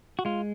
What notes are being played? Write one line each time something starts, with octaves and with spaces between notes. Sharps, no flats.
F#4
G#3 F4